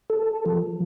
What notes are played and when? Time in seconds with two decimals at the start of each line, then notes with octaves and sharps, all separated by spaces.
0.10 A4
0.46 F3